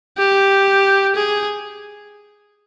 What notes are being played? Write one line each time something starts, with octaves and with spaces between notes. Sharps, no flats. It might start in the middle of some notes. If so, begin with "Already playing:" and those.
G4
G#4